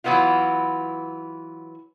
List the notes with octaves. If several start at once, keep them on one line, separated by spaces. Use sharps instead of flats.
E3 F#3 B3 E4 F4